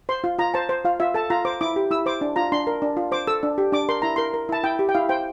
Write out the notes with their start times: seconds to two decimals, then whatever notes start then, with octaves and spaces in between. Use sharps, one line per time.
0.09 C5 C6
0.24 F4
0.38 F4 A#5
0.54 C5 A5
0.69 C5
0.85 F4 F5
1.00 F4 E5
1.14 A4 A5
1.30 F4 A#5
1.45 C5 D6
1.61 E4 D6
1.76 G4
1.91 E4 E6
2.06 C5 D6
2.21 D4
2.36 F4 A#5
2.52 D4 C6
2.67 A#4
2.82 D4
2.97 F4
3.12 C5 D6
3.27 A4 E6
3.43 D4
3.58 G4
3.72 D4 D6
3.89 A#4 C6
4.02 E4 A#5
4.16 A#4 C6
4.34 A#4
4.49 E4 A5
4.63 E4 G5
4.79 G4
4.89 G5
4.95 E4 F5
5.09 C5 G5